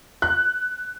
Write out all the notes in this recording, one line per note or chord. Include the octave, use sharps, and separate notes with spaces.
F#6